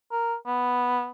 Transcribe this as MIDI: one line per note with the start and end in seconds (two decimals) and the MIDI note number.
0.12 0.35 70
0.46 1.09 59